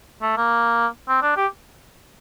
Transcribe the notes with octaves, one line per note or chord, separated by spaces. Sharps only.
A3
A#3
C4
D4
G4